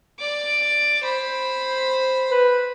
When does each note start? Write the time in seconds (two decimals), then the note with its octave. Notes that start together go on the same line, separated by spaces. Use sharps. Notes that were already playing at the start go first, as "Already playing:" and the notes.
0.19 D5 D6
1.03 C5 B5
2.32 B4